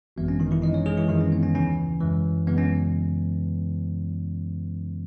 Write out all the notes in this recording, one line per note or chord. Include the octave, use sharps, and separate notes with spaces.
G#1 F#2 E3 G#3 B3
C#4
D#3 D#4
E3 E4
F#2 E3 G#3 D#4 D#5
C#4 C#5
G#3 G#4
E3 E4
F#2 D#3 E3 G#3 D#4
C#4
B3
C#4
D#2 C#3 E3 C#4
F#2 E3 G#3
F#2 C#3 E3 G#3 B3
C#4